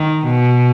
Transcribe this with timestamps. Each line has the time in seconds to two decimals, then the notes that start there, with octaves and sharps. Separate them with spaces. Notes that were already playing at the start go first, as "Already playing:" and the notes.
Already playing: D#3
0.25 B2